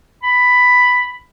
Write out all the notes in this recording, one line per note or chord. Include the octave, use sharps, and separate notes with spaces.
B5